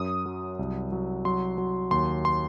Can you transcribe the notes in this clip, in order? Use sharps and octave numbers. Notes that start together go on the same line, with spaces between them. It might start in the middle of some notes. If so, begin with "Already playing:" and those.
Already playing: F#2 D#6
F#3
C2
F#3
F#3 C6
F#3
D#2 C6
C6